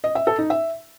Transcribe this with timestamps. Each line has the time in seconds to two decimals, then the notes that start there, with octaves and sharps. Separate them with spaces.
0.04 D#5
0.15 E5
0.27 A4
0.39 D#4
0.50 E5